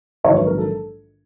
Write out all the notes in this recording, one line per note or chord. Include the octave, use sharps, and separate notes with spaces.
A#1 G#2 D#3 F#3 C#5
B4
A#4
A4